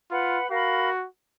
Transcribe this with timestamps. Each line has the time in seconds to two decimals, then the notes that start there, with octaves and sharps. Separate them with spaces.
0.11 F4 B4 F#5 B5
0.51 F#4 A#4 F5 B5